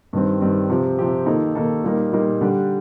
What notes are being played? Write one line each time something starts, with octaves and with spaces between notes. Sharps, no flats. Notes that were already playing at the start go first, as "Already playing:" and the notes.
G2 D#3 G3 C4
G2 D#3 G3 C4
C3 F3 C4 G4
C3 F3 C4 G4
D#3 A#3 D#4 A4
D#3 A#3 D#4 A4
A#2 G3 A#3 D#4 A#4
A#2 G3 A#3 D#4 A#4
D3 G3 D4 G4